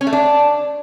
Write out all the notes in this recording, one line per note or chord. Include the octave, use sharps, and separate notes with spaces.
C#4
A3
D4